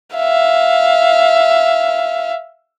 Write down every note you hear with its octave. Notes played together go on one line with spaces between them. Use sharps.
E5 F5